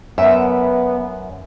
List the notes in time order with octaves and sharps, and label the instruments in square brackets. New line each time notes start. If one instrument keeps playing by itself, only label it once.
[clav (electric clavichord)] F#2 [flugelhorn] B3 [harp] E5